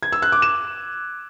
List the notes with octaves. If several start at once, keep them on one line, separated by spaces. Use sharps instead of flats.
G#6
E6
F#6
D6
E7